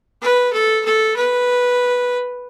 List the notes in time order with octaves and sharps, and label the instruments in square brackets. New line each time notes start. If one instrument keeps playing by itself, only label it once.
[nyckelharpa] B4
A4
A4
B4